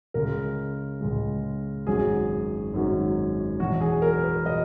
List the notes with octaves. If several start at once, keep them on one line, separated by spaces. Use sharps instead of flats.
C#2 C#3 G#3 A#4
C#2 C#3 G#3
G#1 F#2 D#3 F#3 G#4
G#1 F#2 D#3 F#3
E2 B2 F#3 F#4
G#4
A#4
B4
B2 F#3 D#5